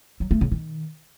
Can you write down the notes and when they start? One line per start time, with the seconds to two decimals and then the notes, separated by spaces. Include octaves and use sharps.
0.20 F#3
0.31 A3
0.41 C#3
0.51 D#3